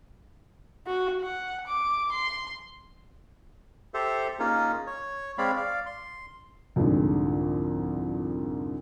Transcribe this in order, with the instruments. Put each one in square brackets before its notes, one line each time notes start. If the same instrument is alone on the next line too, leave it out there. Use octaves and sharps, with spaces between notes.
[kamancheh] F#4
F#5
D6
C6
[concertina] G4 A4 C5 E5
A#3 C#4 D#4 F4 G#4
C#5
G#3 C4 C#5 D5 F5 B5
D5 F5
C6
[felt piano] C2 F2 G#2 D3